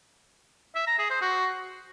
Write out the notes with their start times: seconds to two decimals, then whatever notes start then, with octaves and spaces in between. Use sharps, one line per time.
0.75 E5
0.87 A#5
0.99 G#4
1.10 C5
1.22 F#4